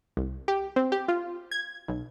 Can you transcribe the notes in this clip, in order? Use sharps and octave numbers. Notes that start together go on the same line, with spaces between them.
C2
G4
C4
G4
F4
G#6
B1